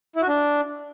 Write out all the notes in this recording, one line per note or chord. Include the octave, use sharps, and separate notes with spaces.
E4
F#4
D4